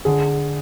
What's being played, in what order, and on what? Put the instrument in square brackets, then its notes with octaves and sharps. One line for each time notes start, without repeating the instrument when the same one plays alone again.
[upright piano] D3 G#4